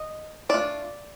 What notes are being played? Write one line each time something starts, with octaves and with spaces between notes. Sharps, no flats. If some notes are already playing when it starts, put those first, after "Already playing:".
Already playing: D#5
A3 D4 F4 D5